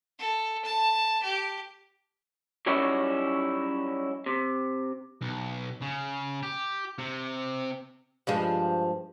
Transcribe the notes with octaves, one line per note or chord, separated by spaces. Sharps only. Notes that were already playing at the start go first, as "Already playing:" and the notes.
A4
A5
G4
F#3 G3 C#4 D#4 E4 F#4
C3
B1
C#3
G4
C3
G2 F3 G#3